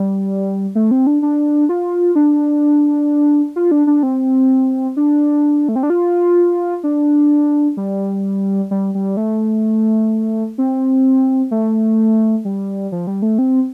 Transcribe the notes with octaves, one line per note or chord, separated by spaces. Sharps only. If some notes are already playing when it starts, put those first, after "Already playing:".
Already playing: G3
A3
C4
D4
D4
F4
D4
F4
D4
D4
C4
D4
A3
C4
D4
F4
D4
G3
G3
G3
A3
C4
A3
G3
F3
G3
A3
C4